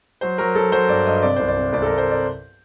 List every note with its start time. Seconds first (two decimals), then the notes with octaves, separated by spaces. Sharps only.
0.21 F#3 C5
0.38 F#3 A#4
0.55 F#3 A4
0.72 F#3 C5
0.88 G2 D5
1.06 G2 D#5
1.22 C3 D5
1.36 C2 C5
1.48 D5
1.57 C3
1.73 C2 D5
1.82 A4
1.86 C2 A#4
1.98 C5
2.11 D5